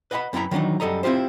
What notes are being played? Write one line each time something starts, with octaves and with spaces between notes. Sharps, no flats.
B4 D#5 F#5 G5 B5
F#2 B3 E4 G5 A#5 B5
D#3 E3 F#3 D4 D#4
F#2 G3 A4 D#5 A#5
C4 E4 F4 G4 C5